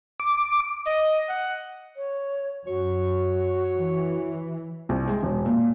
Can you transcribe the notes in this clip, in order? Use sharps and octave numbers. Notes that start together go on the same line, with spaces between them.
D6
D#5
F#5
C#5
F#2 F#4 C#5
E3
C2
G#3
E1
A#2